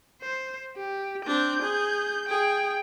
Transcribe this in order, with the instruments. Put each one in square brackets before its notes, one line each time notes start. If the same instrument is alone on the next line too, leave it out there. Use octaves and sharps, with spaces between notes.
[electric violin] C5
G4
[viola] C4 D4 [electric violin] G6
[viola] G#4
[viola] G#4 [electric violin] G5